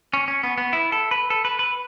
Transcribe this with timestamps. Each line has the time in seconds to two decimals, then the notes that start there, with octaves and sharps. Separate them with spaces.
0.14 C#4
0.28 C#4
0.43 B3
0.58 B3
0.73 E4
0.92 A4
1.11 B4
1.30 A4
1.45 B4
1.59 B4